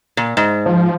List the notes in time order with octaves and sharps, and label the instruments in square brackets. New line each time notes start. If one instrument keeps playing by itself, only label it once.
[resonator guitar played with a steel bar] A#2
G#2
[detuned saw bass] F3